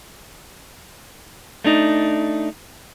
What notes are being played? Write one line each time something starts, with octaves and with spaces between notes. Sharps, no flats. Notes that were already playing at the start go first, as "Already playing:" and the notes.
A3 D4 D#4